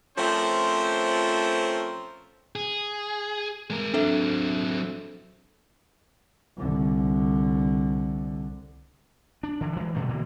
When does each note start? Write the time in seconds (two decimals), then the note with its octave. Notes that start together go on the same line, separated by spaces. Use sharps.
0.17 F3 A3 C4 C#4 A#4 C5
2.56 G#4
3.70 G#3 A#4
3.94 F#3 C4 D4 A4 E5
6.58 C2 D3
9.43 D4
9.61 D3 E3
9.76 E3 G#3
9.95 B2 D3 F3 A3
10.09 B2 D3 E3 A#3